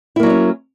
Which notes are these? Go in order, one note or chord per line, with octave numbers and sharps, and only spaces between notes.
F#3 A#3 C#4 D#4 E4